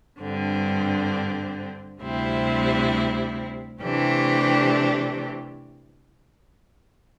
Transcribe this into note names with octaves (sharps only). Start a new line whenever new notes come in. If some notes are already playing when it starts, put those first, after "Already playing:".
G2 D3 C4
D2 C3 G3 C4 E4
C3 E3 A3 D4 G4